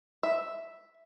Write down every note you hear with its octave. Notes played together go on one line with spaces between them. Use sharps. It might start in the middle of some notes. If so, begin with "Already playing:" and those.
E5